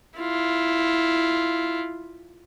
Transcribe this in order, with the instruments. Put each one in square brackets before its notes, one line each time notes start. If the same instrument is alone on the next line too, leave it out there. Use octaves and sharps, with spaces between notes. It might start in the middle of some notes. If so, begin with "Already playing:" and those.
[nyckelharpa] E4 F4